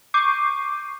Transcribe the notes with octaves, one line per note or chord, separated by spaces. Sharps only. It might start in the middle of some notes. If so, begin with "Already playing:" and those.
C#6 D6 G6 C7 D#7